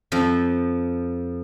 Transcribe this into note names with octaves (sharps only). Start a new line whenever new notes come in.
F2 F3